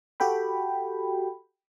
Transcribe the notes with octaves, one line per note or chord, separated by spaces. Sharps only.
F#4 G4 A4 G5 B5